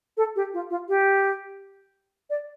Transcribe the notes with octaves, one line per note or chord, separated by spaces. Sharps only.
A4
G4
F4
F4
G4
D5